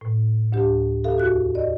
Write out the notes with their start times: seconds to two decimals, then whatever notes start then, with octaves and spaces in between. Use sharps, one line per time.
0.01 A2
0.52 D2 D4 G4
1.04 G4 A4 E5 F5
1.16 E2 F#4 F#6
1.55 D5 D#5